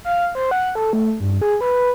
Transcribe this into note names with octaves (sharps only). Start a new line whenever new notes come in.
F5
C5
F#5
A4
A3
G2
G#4
B4